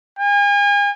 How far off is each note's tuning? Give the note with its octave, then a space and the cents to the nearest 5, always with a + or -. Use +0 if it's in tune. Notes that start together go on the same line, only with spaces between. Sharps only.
G#5 -40